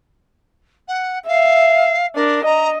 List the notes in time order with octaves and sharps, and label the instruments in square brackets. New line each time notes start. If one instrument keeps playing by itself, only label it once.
[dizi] F#5
[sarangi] E5 [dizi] F5
[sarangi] D4 [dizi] A#4
[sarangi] D#5 [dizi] A#5